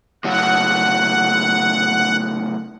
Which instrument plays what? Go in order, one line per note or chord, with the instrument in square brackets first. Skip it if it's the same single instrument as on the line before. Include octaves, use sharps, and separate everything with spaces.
[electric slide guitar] A2 C#3 F#3 [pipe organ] F#5